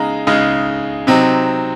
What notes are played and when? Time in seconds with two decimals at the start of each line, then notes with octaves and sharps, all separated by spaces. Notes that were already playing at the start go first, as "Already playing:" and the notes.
Already playing: C#3 G#3 D#4 A#5
0.27 C#3 G#3 D#4
1.07 C3 F#3 C4 D#4